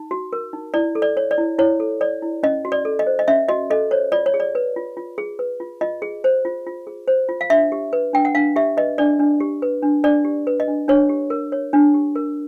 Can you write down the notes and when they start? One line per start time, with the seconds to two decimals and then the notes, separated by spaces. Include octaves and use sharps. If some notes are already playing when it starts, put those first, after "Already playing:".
Already playing: D#4
0.11 F#4
0.33 A#4
0.53 D#4
0.74 E4 D5
0.95 A4
1.02 D5
1.17 C#5
1.31 D5
1.38 E4
1.59 E4 C#5
1.80 A4
2.01 C#5 D5
2.22 E4
2.43 C#4 D#5
2.65 F#4
2.72 D5
2.85 A4
2.99 D#5
3.07 C5
3.19 D#5
3.28 C#4 E5
3.49 F#4 D#5
3.70 A4 D#5
3.91 C5 C#5
4.12 F4 D5
4.26 C#5
4.34 G#4
4.40 D5
4.55 B4
4.76 F4
4.97 F4
5.18 G#4
5.39 B4
5.60 F4
5.81 F4 D#5
6.02 G#4
6.24 C5
6.45 F4
6.66 F4
6.87 G#4
7.08 C5
7.29 F4
7.41 F5
7.50 D4 E5
7.72 G4
7.93 B4
8.13 D4 G5
8.25 F#5
8.35 D4 F5
8.56 G4 E5
8.77 B4 D#5
8.98 D4 D5
9.19 D4
9.40 G4
9.62 B4
9.83 D4
10.03 D4 D5
10.25 G4
10.47 B4
10.60 D#5
10.68 D4
10.88 D4 C#5
11.09 G4
11.30 A#4
11.52 C#5
11.73 D4
11.94 G4
12.15 A#4